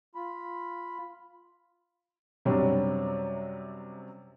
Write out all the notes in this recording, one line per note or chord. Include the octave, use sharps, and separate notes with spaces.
F4 B5
F#2 C3 F#3 G3 D4